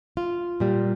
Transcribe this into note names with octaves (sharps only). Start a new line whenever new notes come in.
F4
A#2 G3